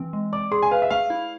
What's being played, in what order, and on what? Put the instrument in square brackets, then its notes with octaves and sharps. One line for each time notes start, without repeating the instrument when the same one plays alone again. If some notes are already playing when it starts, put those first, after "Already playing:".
Already playing: [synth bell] E3 C4
G#3
[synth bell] D5 [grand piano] D6
[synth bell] G#4 [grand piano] C6
[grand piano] G#5
[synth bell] B4 [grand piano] F5
[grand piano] E5
[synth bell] A3 [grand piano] F5
[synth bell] E4